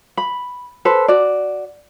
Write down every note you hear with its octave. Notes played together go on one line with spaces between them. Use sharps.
B5
A4 B4 C5
F#4 D5